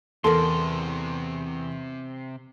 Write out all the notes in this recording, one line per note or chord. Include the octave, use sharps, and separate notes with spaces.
E2 C3 A4 A#4 D5 C6